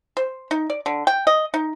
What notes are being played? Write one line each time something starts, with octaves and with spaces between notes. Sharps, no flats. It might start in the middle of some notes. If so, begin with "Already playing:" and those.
C5
D#4
D5
D3
G5
D#5
D#4